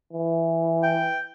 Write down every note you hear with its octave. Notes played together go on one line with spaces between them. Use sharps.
E3
G5